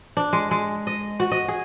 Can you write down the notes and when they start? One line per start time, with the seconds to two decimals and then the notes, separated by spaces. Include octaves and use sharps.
0.17 D4
0.33 G#3
0.51 G#3
0.87 D#5
1.20 F#4
1.31 D#5
1.48 G#4